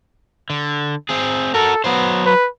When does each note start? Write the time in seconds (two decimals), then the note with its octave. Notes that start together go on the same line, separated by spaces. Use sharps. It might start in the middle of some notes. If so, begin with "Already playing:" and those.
0.50 D3
1.09 C4 G#4
1.54 F#4 A4 A#4
1.84 F#3 B3 C5
2.26 B4